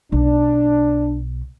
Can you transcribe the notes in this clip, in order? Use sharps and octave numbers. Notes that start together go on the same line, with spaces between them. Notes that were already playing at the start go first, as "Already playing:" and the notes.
B1 D4